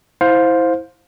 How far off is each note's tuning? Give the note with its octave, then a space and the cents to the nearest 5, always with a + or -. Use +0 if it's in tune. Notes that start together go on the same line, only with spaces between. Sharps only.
E4 -15 C5 +0 F5 +20